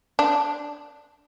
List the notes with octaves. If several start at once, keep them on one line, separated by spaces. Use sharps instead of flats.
D4